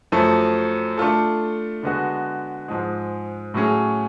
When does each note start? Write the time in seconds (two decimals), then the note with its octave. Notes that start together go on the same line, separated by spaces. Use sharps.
0.12 F#2 F3 A3
0.98 A3 D4 F4 A4
1.83 D3 G#3 B3 F#4
2.68 G#2 F3 G#3
3.54 A2 F#3 C#4 G#4